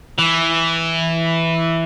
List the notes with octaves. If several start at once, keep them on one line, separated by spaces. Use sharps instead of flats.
E3